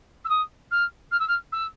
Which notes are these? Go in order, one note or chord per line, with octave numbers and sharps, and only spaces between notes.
E6
D#6
F6
F6
E6
F6
E6